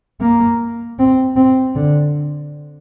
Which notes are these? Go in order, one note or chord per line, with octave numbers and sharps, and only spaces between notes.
A#3
C4
C4
D3